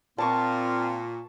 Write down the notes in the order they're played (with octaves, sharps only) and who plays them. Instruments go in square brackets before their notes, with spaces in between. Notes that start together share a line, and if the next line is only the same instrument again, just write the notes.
[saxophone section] A#2 [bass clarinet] C4 [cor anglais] F4 [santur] A5 C#6